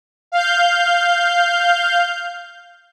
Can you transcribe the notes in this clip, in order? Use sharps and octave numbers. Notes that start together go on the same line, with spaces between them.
F5 G6